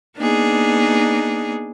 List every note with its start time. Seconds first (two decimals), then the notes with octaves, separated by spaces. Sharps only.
0.17 A#3 B3 D4 D#4 G#4